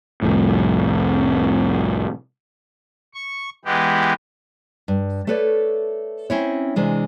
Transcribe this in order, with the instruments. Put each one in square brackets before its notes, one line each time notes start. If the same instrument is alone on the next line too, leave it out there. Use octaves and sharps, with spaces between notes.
[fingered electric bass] C2 F2 A2
[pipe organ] C#6
E3 G#3 B3 G4
[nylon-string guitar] G2
A3 A4 B4 C#5 D5
C4 C#4 E4 C#5
C3 E3 G#3 D4